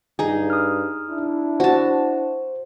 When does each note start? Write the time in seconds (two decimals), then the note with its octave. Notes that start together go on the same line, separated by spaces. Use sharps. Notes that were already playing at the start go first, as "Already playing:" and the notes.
0.19 G2 D#4 G#4
0.50 D#6 F6
1.09 D4 E4
1.60 F#4 C5 A5